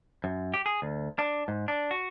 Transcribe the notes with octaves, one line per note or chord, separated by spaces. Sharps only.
F#2
G4
G#4
D2
D4
G#2
D4
F#4